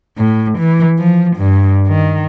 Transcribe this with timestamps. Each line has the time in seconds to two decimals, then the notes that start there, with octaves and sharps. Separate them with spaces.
0.18 A2
0.59 E3
0.99 F3
1.37 G2
1.88 D#3